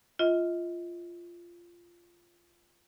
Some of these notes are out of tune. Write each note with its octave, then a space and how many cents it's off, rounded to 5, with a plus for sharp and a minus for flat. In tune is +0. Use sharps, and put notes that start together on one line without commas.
F4 -10 D#5 +35